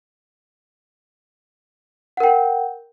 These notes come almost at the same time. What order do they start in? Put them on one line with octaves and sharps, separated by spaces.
F#5 A#4 G5